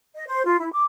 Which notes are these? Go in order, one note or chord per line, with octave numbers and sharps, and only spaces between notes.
D#5
C5
F4
E4
D6